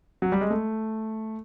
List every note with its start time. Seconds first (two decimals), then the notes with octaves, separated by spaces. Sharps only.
0.22 F#3
0.32 G3
0.41 G#3
0.50 A3